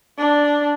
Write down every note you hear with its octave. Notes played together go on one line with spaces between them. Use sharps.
D4